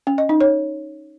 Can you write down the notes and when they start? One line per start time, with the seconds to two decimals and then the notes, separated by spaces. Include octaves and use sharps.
0.07 C#4
0.18 D#5
0.29 D#4
0.41 C#5